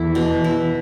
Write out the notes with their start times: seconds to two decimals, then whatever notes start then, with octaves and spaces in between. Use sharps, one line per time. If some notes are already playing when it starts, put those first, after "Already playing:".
Already playing: E2 E3 E4 A4
0.15 B2
0.44 E4